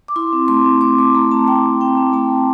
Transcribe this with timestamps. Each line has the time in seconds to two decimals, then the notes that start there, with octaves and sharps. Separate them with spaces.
0.08 D6
0.16 E4 C6
0.33 C4
0.48 A3 C6
0.65 C4
0.81 A3 D6
0.98 A3 C6
1.15 A3 A#5
1.31 C4 A5
1.48 A3 G5
1.65 A3
1.81 C4 G5
1.97 C4
2.13 A3 A5
2.30 A3